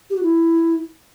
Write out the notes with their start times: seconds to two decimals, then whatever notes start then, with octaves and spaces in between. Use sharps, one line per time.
0.10 G4
0.16 F#4
0.23 E4